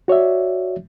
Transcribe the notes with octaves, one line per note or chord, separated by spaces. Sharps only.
F#4 C#5 D5 E5